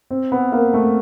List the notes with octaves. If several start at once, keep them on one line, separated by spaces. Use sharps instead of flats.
C4
B3
A#3
A3